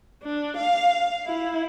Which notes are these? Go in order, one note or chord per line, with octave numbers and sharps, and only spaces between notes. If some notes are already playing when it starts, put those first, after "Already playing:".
D4
F5
E4